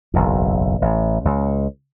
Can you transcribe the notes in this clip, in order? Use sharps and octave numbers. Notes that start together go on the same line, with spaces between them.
F#1 B1 E2
A1
C#2